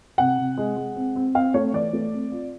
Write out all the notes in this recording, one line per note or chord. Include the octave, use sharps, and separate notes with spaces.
C3 F#5
C3
G#3
G#3
C4
C4
C4 F5
A3 C#5
E3 D5
A3
C4
F4